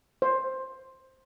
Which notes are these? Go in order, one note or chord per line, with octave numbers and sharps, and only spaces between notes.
C5